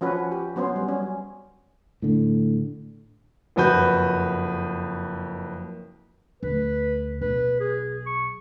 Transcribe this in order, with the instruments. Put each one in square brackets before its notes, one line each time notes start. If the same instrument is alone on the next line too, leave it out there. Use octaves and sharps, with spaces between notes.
[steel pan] F3 C#4 F#4 B4
G4
F#3 B3 C#4 C5
G3
C#4
[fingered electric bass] A2 D3
[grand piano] F#1 F2 F#4 B4 G6
[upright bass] D2 [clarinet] B4
[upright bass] B1 [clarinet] B4
[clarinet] G#4
C#6